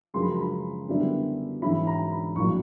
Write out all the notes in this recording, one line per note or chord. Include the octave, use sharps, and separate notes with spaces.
F#2 C#3 F3 G#3 C6
B5
A#5
B5
F#2 D3 G3 B3 E4
G#2 E3 G#3 C#4 E4 B5
A#5
B5
A#1 A2 F#3 A#3 C#6